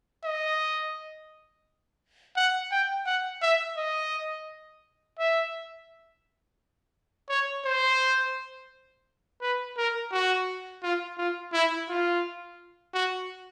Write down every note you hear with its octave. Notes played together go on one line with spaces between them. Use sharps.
D#5
F#5
G5
F#5
E5
D#5
E5
C#5
C5
B4
A#4
F#4
F4
F4
E4
F4
F#4